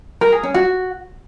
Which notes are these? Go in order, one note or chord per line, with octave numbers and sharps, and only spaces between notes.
A#4
G#4
C#4
F#4